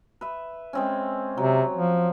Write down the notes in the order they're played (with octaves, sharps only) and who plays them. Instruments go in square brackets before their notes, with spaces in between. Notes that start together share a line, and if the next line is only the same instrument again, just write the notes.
[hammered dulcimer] B4 E5
G#3 C4 C#4
[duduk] C3 [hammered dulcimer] F#3
[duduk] F3